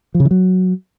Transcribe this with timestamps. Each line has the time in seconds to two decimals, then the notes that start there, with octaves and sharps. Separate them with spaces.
0.14 F3
0.20 C#3
0.25 E3
0.31 F#3